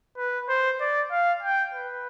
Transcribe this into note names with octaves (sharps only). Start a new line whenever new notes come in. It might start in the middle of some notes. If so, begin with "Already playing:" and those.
B4
C5
D5
F5
G5
B4